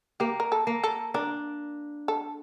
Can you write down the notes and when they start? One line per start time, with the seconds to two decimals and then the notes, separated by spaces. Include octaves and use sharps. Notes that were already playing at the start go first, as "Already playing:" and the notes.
0.20 A#3 G4
0.40 A#4
0.52 A4
0.67 A#3
0.84 A4
1.14 D4 A#4
2.08 A4